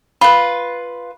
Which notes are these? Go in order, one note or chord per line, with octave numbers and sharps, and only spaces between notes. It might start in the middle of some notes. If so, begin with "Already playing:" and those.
F4 B4 B5